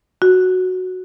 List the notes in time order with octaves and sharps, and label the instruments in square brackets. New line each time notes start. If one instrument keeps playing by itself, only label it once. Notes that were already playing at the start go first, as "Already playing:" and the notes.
[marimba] F#4